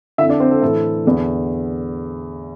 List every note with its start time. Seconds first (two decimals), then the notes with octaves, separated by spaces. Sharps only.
0.18 D3 E4 E5
0.21 F2
0.29 D4 D5
0.40 C4 C5
0.51 A4
0.62 A2 E3 A4
1.05 E2 D3